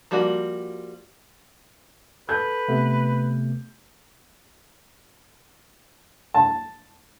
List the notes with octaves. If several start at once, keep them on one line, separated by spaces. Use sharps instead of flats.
F3 G3 A#3 F#4
A4 B4 G6
C3 A3 B3
A5